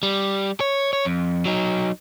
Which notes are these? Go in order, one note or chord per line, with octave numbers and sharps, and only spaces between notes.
G3
C#5
C#5
F2
F#3 D#4